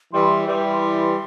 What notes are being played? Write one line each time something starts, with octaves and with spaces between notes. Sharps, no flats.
E3 G3 C6
E3 G3
C6